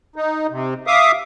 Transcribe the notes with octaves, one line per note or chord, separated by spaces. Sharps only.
D#4
C3
E5 F5 D6 D#6